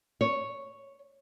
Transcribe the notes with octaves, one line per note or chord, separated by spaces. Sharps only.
C#5